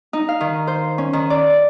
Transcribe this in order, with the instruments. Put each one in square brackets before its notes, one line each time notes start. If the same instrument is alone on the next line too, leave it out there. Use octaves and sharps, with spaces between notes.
[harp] D#4
F5
D#3
C5
C#4
D#3
D5